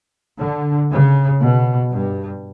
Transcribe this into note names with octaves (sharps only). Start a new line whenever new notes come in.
D3
C#3
B2
G2